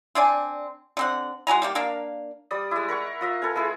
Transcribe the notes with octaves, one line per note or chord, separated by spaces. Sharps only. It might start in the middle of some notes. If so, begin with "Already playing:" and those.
C4 D4 D5 G#5
D3 C4 F#5
G#3 F#4 G#5 A#5
G3 A#3 G4
A#3 D4 A#4 F5
G3 D5 D#6
G#3 E4
A#4 F#5 C#6
F4 D#5 E5
A4 B4 F5 G#5
G#3 E4 G#4